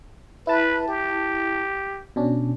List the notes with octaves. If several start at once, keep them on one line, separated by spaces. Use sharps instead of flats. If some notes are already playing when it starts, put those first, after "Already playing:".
E4 B4 A5
G4
B2 C#4 D4